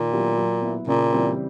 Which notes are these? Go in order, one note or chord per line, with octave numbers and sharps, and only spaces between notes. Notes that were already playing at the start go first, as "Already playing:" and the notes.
Already playing: A#2 D#3
F#3 B3 E4 G4
F#3
B3 E4
A#2 C#3
E3 G3 C4